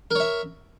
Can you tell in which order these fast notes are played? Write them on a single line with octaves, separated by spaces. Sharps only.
A#4 C#5 E5